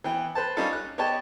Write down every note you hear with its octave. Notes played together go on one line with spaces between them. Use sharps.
E3 B3 G5
B4 C5 A5
G3 C#4 D#4 F4 A4
F#6
B3 G4 C#5 D#5 G5 A5